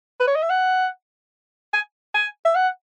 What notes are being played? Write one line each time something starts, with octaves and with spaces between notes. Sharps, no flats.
B4
C#5
D#5
E5
F#5
G#5
G#5
E5
F#5